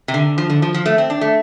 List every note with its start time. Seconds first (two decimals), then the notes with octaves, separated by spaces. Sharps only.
0.08 C3
0.14 D3
0.38 F3
0.50 D3
0.62 F3
0.74 F3
0.86 A3
0.98 C4
1.10 D4
1.21 A3